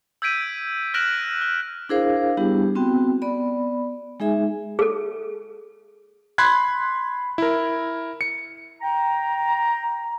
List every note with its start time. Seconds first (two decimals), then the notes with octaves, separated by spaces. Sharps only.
0.22 E6 G6 G#6 B6 D7 D#7
0.94 F6 F#6 A#6 D7 E7 F#7
1.41 F6
1.89 D4 E4 G#4 A#4 C5 F5
2.37 G3 B3 D4 E4 G4
2.75 B3 C4 F#4 G5
3.22 B3 D5 B5
4.20 G#3 D#4 G#4 E5 G#5
4.79 G#4 A4
6.38 B5 C6 F#6 G#6
7.38 E4 A#4
8.21 C#7
8.81 G5 A#5